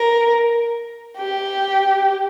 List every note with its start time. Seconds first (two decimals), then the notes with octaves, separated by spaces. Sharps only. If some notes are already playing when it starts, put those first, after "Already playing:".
Already playing: A#4
1.17 G4